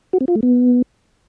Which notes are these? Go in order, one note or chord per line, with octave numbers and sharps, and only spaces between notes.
F#4
C4
F4
A3
B3